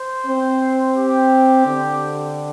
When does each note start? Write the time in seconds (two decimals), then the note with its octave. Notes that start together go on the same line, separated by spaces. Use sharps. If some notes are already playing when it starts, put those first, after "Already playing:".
Already playing: C5
0.27 C4
0.96 G4
1.66 D3